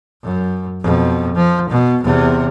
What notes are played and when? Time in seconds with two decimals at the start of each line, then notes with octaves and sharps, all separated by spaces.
0.23 F#2
0.81 F2 B2
1.35 F3
1.70 B2
2.03 E2 C3